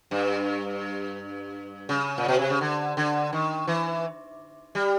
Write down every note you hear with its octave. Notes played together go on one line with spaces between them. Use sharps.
G2
C#3
A#2
B2
C3
C#3
D3
D3
D#3
E3
G3